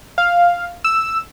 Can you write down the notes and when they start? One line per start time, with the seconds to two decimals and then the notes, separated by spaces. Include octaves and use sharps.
0.18 F5
0.84 E6